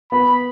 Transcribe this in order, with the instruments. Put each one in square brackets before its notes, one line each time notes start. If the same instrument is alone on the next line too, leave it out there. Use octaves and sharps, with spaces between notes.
[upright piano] B3 [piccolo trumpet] B5